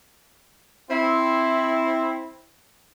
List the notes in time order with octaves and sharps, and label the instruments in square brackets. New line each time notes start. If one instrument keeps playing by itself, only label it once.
[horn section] C4 E4